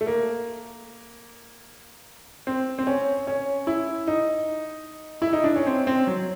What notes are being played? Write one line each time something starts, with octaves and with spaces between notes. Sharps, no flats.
A3
A#3
C4
C4
C#4
C#4
E4
D#4
E4
D#4
D4
C#4
C4
C4
F#3